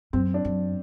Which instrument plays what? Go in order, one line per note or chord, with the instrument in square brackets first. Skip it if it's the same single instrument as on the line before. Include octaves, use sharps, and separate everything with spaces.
[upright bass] F#2 [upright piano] C4
[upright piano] D4
[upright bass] F#2